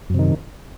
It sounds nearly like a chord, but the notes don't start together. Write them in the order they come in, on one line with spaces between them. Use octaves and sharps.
F#2 C3 D#3